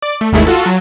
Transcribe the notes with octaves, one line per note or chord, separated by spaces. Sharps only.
D5
A3
G#1 D#2 D#3 G#3 A3 E4
F4 F#4 A4
F#3